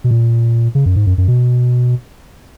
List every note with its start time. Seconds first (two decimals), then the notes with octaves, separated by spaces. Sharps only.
0.04 B2
0.11 A#2
0.75 C#3
0.86 F#2
0.96 G#2
1.07 F#2
1.18 F#2
1.28 B2